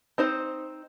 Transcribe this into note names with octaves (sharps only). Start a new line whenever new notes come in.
C4 D#4 C5